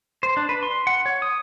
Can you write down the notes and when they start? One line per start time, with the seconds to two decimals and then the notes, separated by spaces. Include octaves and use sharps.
0.23 C5
0.37 D4
0.49 B4
0.63 C6
0.87 F#5
1.06 C#5
1.22 D#6